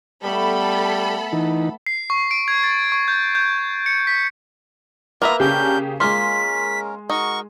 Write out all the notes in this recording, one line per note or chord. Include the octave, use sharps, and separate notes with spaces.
G3 A3 B3 A4 B5
E3 D#4
C7
C#6
D7
G#6
A6
C#6
G6
G6
C#7
B6
A#3 B3 F4 B4 E5 A#5
C#3 C#4 D4 G4 G#4 A#4 G6
G#3 A#3 C#4 F4 A#4 C6 B6
D#4 F#4 A#4 C#6